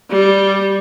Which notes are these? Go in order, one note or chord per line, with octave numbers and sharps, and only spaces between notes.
G3